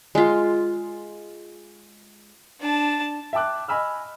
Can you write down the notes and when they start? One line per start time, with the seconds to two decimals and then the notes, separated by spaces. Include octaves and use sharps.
0.15 G#3 F4
2.61 D4 A5
3.33 E5 G5 A5 D6 F#6
3.68 D#5 G#5 B5 E6 F6